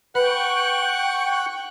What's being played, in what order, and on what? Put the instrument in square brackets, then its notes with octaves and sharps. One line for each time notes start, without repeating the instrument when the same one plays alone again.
[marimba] B4 B5 [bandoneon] F#5 F#6 [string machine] G5 C#6